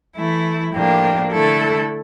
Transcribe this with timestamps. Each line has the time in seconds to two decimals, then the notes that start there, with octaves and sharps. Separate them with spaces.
0.16 E3 A3 E4
0.73 A2 F3 A#3 D4 G4
1.30 D3 A3 E4 A4